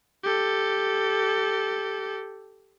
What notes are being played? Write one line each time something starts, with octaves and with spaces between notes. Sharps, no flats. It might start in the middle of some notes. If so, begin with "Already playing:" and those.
G4 A4